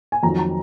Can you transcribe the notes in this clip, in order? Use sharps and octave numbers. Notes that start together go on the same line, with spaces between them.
G#5
F2 D#3 F#3 A#5
A#5